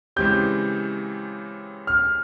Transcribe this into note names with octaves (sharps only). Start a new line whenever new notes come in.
C#3 E3 G#3 C4 G4 G6
F6